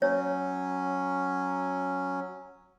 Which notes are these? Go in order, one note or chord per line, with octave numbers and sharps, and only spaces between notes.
F#3 C#4 C#5